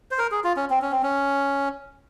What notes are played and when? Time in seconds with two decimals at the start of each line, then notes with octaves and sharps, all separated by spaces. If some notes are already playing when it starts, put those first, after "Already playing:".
0.11 C5
0.18 A#4
0.31 G#4
0.44 F4
0.56 C#4
0.70 C4
0.82 C#4
0.92 C4
1.03 C#4